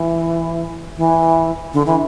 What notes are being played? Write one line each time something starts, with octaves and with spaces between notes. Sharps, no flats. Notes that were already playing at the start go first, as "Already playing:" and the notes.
Already playing: E3
E3
D3
E3